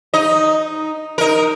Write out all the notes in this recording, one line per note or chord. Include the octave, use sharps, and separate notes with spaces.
D#4 D#5
D#4 A#4